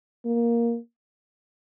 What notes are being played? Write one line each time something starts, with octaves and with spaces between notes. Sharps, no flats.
A#3